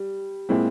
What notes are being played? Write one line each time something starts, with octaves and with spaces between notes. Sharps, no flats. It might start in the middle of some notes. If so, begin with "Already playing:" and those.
Already playing: G3
A#2 G#3 C4 E4